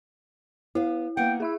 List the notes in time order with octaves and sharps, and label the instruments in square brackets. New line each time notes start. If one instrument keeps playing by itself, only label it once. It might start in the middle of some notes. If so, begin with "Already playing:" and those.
[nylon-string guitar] B3 F5 [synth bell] E4
[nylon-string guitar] A#3 B3 F#5 [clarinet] G5
[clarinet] E4 [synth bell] G#4 E5 E6